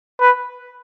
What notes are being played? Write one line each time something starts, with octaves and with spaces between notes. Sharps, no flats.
B4